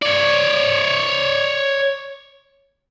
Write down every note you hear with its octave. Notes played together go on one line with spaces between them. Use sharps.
C#5 D5